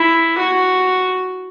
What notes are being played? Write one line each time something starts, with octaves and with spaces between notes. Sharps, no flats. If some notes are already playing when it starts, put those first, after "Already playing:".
Already playing: E4
F#4